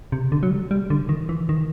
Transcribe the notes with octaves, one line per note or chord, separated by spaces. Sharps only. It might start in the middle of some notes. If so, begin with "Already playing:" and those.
C3
D3
F#3
G3
G3
D3
D#3
E3
D#3